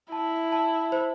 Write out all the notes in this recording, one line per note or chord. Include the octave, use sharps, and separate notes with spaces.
E4 A5
A5
C5